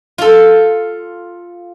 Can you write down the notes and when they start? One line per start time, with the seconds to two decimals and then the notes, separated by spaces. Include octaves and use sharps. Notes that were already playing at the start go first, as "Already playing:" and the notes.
0.18 F4 A4